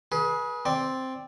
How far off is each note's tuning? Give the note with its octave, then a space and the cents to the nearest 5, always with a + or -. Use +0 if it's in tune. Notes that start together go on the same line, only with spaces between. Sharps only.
G#4 +20 B4 -30
C4 +0 D5 +0